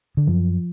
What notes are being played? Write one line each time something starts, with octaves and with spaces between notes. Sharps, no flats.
D3
F#2 F3